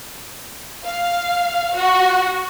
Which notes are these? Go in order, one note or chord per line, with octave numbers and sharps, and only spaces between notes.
F5
F#4